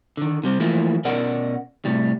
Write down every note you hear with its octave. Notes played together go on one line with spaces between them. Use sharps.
D3 D#3
C3 G3 C4
E3 F3 A3 A#3 E4
B2 C#4 A#4 D5 F#5
A2 C3 G3